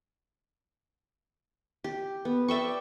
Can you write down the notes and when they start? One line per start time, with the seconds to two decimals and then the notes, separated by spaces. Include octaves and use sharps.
1.84 G4
2.25 B3
2.48 D5 E5 G5 C#6